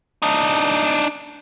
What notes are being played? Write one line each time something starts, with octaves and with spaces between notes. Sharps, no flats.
D4 D#4